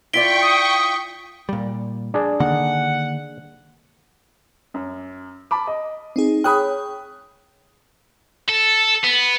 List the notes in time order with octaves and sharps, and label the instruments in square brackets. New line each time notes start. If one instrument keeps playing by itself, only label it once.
[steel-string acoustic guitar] E4 F4 D5 [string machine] G5 C#6 [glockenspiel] B6 D7 G7
[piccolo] D#6
[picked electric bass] A#2 G3
[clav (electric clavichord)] D4 G#4 D5
[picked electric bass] D3 D#3 A#3 [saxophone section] F#5
[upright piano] F#2
A5 B5 D6
D#5
[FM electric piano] C4 D#4 G#4
[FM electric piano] G#4 C#5 G5 [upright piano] B5 D#6 F#6
[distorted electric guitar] A4
B3